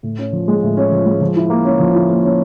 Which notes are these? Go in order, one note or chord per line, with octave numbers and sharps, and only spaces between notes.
A2
C#4
F3
G#3
A2
C#4
F3
G#3
F3
E4
A#3
C#4
F3
E4
A#3
C#4